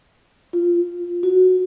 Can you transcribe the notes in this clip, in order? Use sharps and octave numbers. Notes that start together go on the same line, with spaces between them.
F4
F#4